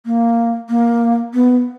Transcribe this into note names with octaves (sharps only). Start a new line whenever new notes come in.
A#3
A#3
B3